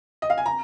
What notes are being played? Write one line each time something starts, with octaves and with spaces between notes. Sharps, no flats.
D#5
F5
G#5
A#5